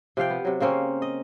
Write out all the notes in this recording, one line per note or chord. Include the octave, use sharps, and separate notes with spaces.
C3 F3 F5 G5
B3
C3 F#3
C#3 A#3 C4 C#4
D#5